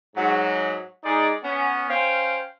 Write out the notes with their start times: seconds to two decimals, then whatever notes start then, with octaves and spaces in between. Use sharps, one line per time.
0.16 G#2 F#3
1.04 G#3 D#4 G#4 D5
1.43 B3 C#4
1.89 C#4 C5 F5 G5